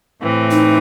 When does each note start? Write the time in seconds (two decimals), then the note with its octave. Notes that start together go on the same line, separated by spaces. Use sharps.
0.21 A2 E3 C4
0.51 D#4